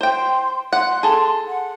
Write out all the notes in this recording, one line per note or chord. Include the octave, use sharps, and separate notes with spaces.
C5 G5 C6
F#5 C6
G#4 A4
F#5